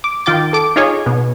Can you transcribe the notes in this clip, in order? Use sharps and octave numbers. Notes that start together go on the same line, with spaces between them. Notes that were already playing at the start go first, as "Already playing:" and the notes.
D6
D#3 F4 G5 D6 A6
A4 D6 D7
D#4 F4 G#4 C#5 D#5 G#5
B2